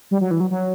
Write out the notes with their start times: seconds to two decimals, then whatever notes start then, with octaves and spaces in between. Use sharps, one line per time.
0.11 G3
0.21 F#3
0.31 E3
0.40 F#3
0.50 F#3